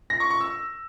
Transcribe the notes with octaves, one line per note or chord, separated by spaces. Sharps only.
A#6
C#6
C#6
E6